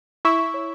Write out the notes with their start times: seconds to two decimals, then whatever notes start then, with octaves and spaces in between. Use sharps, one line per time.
0.25 E4 E5 C#6
0.39 C#6
0.54 C#5